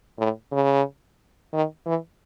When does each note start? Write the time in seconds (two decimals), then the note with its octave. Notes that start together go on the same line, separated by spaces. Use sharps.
0.19 A2
0.52 C#3
1.53 D#3
1.86 E3